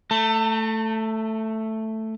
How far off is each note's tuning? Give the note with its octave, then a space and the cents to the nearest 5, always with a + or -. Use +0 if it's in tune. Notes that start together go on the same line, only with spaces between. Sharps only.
A3 +5 A5 +40